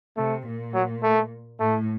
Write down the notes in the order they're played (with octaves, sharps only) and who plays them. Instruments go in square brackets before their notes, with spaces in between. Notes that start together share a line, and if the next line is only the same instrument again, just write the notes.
[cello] C3 [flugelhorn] A3
[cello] A#2
[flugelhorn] F#3
A3
[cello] A2 [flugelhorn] A3